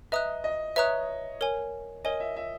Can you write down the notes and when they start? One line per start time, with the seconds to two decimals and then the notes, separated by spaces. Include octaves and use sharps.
0.12 B4 D#5 E5 A#5 D#6 F#6
0.44 D#5
0.76 B4 C#5 E5 A#5 D#6 F#6
1.41 A#4 C#5 G#5
2.04 A#4 C#5 D#5 G#5
2.20 E5
2.36 E5